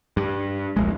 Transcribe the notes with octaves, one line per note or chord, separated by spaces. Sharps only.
G2
D#1 A#1 G#3